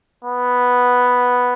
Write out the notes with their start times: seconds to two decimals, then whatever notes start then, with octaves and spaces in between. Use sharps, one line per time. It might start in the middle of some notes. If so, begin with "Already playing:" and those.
0.25 B3